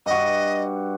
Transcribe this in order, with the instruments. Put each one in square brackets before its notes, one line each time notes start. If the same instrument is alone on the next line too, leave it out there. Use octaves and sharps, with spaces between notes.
[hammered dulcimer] G2 F#4 [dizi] D#5